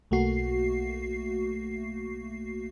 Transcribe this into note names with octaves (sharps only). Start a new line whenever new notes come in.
B1 A3 A#3 F#4 C7